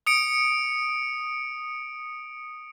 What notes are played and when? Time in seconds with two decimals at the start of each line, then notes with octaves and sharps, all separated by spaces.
0.07 D#6 C#7 D7